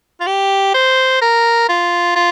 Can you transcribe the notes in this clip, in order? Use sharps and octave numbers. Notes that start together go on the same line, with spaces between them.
F4
G4
C5
A#4
F4
F4